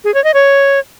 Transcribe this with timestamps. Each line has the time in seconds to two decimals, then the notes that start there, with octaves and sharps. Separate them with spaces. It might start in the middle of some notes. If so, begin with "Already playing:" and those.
0.04 G#4
0.14 C#5
0.24 D#5
0.34 C#5